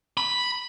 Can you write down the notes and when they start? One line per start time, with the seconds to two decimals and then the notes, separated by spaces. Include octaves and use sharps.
0.17 B5